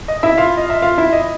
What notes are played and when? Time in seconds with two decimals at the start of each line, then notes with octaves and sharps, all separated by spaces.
0.08 D#5
0.23 E4 E5
0.38 F4 F5
0.57 D#5
0.70 E5
0.82 F4 F5
0.98 E4 E5
1.13 D#5